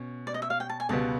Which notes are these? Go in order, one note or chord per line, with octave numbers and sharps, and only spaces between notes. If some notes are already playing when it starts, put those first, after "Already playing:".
Already playing: B2 C#4
D5
D#5
E5
F5
G5
A5
G#5
C#2 B2 G3 B3 A5